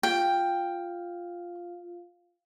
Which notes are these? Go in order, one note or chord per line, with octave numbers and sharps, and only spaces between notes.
F4 F5 G5